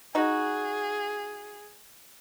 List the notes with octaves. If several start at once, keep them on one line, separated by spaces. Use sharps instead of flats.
D#4 F#4 G#4